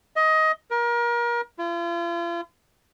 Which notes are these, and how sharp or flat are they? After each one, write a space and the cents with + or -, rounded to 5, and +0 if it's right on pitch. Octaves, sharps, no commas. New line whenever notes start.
D#5 +20
A#4 +30
F4 -40